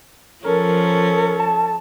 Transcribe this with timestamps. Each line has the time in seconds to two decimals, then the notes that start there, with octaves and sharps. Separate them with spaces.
0.44 F3 C#4 A4 A#4
1.40 A5